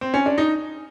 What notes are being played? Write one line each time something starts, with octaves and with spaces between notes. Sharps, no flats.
C4
C#4
D4
D#4